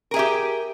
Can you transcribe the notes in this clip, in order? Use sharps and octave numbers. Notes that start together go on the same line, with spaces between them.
G4 G#4 A#4 E5